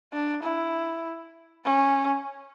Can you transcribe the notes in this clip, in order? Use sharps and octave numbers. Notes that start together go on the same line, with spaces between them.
D4
E4
C#4